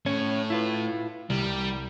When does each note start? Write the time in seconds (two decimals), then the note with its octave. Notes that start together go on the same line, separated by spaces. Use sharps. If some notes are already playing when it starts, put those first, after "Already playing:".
0.06 A2 C#4
0.50 E4 F4 B4
1.30 C2 G3